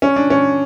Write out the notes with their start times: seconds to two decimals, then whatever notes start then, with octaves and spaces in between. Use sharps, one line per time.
0.02 C#4
0.16 D4
0.30 C#4